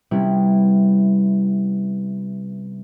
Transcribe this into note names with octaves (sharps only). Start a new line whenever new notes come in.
C3 G3 B3 C#4 E4